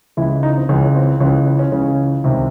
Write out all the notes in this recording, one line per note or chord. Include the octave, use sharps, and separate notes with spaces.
C#2 C#3 E3 E4
E4
D#4
C4
C#2 C#3 E3 C#4
C#4
C4
C#2 C#3 E3 C#4
C#4
C#4
C#2 C#3 E3 C#4
C2 C3 D#3